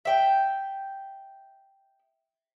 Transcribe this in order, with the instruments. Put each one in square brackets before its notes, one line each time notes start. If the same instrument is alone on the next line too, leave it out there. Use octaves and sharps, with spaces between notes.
[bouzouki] E5 G5